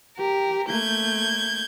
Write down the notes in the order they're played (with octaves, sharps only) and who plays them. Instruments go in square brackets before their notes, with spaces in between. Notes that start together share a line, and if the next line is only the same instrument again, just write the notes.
[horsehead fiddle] G4 [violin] A#4
[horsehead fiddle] A3 A#3 [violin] G6 G#6